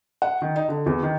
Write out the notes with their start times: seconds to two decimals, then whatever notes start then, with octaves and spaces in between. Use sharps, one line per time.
0.22 F#5
0.42 D#3
0.56 D#4
0.68 D3
0.86 E2
1.03 D#3